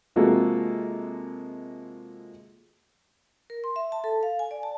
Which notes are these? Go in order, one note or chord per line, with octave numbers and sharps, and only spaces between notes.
C3 F3 G#3 A#3 F#4 A4
A#4
C6
E5
A5
A4
F5
G#5
D5
A5